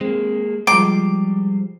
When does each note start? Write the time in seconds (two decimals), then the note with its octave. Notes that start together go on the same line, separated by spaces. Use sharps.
0.01 G#3 A#3 C4
0.67 F3 G3 G#3 C5 D6